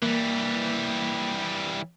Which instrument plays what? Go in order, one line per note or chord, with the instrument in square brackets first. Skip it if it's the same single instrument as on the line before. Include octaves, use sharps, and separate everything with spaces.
[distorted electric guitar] E3 G3 [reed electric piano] A#3